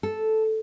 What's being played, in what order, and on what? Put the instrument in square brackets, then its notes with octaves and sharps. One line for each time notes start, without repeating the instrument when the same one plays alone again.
[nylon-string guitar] A4